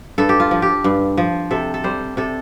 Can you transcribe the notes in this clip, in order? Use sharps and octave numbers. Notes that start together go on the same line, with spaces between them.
G2 A4
G4
F4
F3
G4
G2
F3
C3 A4
A4
G3 C5
C3 A4